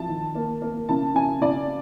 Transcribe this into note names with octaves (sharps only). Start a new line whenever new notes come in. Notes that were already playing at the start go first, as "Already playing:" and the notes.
Already playing: F3 A5
D#3
A#3
A#3
C#3 A5
C#3 G#5
C#3 D5